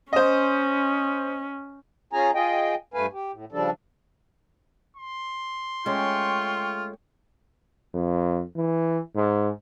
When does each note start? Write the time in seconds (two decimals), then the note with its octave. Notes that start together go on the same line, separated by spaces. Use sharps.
0.13 C#4 C5 D#5
2.13 C#4 F4 G#4 G#5 A#5
2.35 F4 G#4 D#5 G5
2.94 G2 A3 B4 F5 G#5
3.13 G4
3.32 A2
3.52 C#3 F3 G3 D4 A4
4.97 C6
5.86 G#3 A3 C#4 F4 G5 C#6
7.94 F2
8.56 E3
9.15 G#2